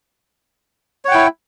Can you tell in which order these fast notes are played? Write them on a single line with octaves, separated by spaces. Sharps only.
C#5 F#5 G5 E4